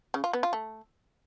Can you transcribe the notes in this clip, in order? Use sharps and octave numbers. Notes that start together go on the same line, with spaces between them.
C#3
F4
B3
F4
A3